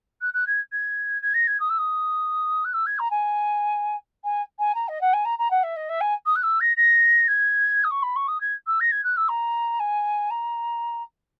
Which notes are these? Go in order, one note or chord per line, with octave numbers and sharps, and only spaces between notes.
F#6
F#6
G#6
G#6
G#6
A#6
G#6
D#6
E6
D#6
F#6
E6
G#6
A#5
G#5
G#5
G#5
A#5
D#5
F#5
G#5
A#5
A#5
F#5
E5
D#5
E5
G#5
D#6
F#6
E6
A#6
A#6
G#6
D#6
C#6
B5
C#6
D#6
G#6
E6
A#6
G#6
F#6
E6
A#5
G#5
A#5